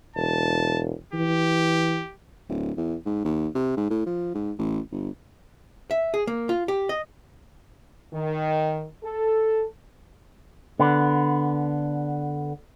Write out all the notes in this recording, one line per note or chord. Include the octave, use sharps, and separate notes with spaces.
E1 A5
E3 G4
D1
E2
G#2
D#2
C3
G#2
A2
F3
G#2
A1
G1
E5
G#4
A#3
F4
G4
D#5
D#3
A4
D3 B3